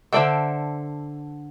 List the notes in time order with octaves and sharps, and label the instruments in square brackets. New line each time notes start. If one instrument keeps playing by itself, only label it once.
[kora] D3 A4 C5 [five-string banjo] D5 E5 G5